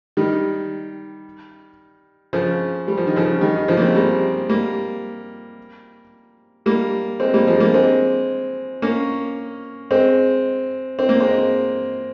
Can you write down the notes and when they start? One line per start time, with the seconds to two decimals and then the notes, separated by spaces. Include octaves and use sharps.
0.17 D#3 G3
2.33 C#3 F3
2.88 G3
2.97 F3
3.07 D#3
3.16 C#3 F3
3.41 D#3 G3
3.55 D#3
3.68 C#3 F3
3.77 A#3
3.82 G#3 C4
3.95 G3 A#3
4.49 G3 A#3
6.66 G3 A#3
7.20 G#3 C4
7.34 G3 A#3
7.47 F3 G#3
7.60 G3 A#3
7.74 G#3 C4
8.82 A#3 C#4
9.91 G#3 C4
10.99 C4
11.09 A#3
11.20 G#3 C4